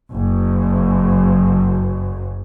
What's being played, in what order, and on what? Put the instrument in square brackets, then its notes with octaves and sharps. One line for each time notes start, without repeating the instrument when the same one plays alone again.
[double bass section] F#1 F#2